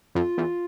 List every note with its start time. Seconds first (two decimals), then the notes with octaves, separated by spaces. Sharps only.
0.15 F2 F4
0.38 E2